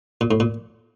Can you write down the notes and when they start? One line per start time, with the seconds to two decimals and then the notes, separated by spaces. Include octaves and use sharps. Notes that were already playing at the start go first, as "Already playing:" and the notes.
0.21 A#2
0.31 A2
0.40 A#2